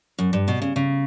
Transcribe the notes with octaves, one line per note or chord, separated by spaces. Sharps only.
F#2
G2
B2
C#3
C#3